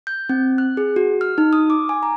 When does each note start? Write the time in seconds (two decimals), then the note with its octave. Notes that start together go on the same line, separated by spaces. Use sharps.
0.07 G6
0.29 C4
0.58 F#6
0.77 G#4
0.96 F#4
1.21 F6
1.38 D#4
1.53 D#6
1.70 D6
1.89 G#5
2.03 A#5